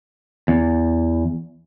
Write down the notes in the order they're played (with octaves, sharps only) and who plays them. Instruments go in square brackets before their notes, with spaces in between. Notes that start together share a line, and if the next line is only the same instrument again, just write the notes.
[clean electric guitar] E2